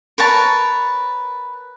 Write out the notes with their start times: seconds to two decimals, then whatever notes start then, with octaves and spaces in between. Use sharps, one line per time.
0.18 A#4 B4 C#5 A5